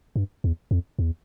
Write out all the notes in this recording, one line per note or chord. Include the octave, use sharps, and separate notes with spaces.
G2
E2
F2
E2